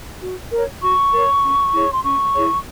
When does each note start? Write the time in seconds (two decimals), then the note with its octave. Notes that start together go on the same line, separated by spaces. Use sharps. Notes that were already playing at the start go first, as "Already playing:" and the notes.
0.22 F#4
0.52 A#4 C#5
0.83 F#4 C#6
1.13 A#4 C#5
1.43 C#4
1.74 E4 G#4 C#5
1.93 C6
2.03 C#4 C#6
2.34 E4 G#4 C#5